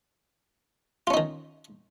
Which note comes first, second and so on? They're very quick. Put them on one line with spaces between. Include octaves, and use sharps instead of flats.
F4 C#4 D#4 D#3